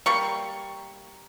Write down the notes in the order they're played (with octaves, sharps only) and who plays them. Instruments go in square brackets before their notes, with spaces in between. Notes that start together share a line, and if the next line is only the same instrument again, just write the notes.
[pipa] G3 A#3 C#6